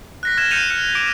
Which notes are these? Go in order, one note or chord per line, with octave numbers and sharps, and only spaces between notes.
F#6 A#6 B6
F6 G#6 A#6 E7
F6 G6 C#7 D#7 F7
F6 C#7
D6 D7